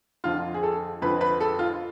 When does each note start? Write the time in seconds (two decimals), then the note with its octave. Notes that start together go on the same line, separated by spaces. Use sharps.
0.24 F2 D3 F3 F4
0.54 G#4
0.63 A4
1.02 F2 D3 F3 B4
1.21 B4
1.41 A4
1.59 F4